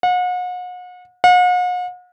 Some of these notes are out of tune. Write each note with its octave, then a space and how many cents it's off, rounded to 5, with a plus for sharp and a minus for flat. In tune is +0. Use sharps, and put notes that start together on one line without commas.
F#5 -40
F#5 -45